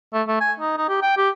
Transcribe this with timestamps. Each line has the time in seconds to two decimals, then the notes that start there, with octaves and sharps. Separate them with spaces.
0.13 A3
0.28 A3
0.41 G#5
0.60 D#4
0.77 D#4
0.89 G4
1.02 G5
1.17 G4